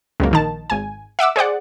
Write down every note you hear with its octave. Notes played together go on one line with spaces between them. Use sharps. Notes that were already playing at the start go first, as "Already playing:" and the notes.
C#2 F#2 A#3
A#1 D#3 A5
G#1 G#5
E5 F#5 D6 E6
G#4 C5 D5 F#5